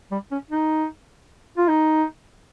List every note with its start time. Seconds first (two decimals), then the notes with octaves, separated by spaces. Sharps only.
0.11 G3
0.31 C#4
0.51 D#4
1.58 F4
1.68 D#4